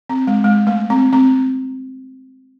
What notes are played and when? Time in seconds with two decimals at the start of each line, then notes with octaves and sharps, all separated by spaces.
0.10 C4
0.27 G#3
0.44 G#3
0.67 A3
0.90 C4
1.13 C4